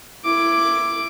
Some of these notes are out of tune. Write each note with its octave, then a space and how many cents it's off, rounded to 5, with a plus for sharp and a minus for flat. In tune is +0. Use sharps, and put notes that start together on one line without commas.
E4 +15 D6 +0